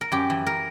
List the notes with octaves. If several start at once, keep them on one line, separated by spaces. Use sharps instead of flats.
A#4
F#2 G4
E3
A#4